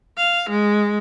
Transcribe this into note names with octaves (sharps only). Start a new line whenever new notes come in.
F5
G#3